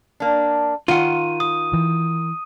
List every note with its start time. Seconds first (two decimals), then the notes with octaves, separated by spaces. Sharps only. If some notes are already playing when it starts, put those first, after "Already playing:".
0.20 A#3 D4
0.88 D#3 F4 F#5 D#7
1.40 D#6
1.73 E3